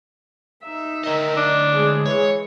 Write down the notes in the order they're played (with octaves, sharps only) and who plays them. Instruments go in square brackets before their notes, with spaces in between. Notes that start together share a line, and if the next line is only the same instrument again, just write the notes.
[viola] D#4 E5
[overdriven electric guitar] D2 D#5 [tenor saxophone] D#3
[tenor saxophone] D4
[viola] G#3 G#4
[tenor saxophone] E3 [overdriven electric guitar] C#5